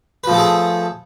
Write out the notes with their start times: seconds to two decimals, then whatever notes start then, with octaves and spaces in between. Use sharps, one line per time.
0.24 B4
0.27 F3
0.31 A3
0.34 A4
0.38 G#4